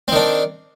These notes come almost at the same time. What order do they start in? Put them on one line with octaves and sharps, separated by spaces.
C4 D#3 D4